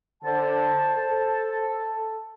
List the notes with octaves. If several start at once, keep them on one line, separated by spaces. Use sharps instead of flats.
D3 C5 A5
A4